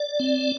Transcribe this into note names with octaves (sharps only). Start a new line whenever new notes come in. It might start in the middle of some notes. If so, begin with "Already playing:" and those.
Already playing: D5
C4